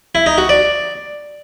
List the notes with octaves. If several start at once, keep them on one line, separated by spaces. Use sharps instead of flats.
E4
D#4
F#4
D5